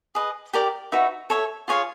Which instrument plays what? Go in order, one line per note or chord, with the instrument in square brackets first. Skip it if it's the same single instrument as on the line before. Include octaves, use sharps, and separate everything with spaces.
[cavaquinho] G#4 B4 D#5
G4 A#4 D5 G5
D#4 F#4 B4 E5
A4 C#5 E5
F4 G#4 C#5 F5